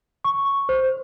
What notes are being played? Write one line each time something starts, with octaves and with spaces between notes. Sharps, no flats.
C#6
C5